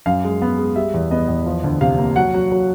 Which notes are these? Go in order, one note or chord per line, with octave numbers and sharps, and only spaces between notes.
F#2 F5
G#3
B3
G#3
G3 E5
E2
B3 D#5
E2
F3
D2
C3 F5
A#3
F#3 F#5
F#3
F#3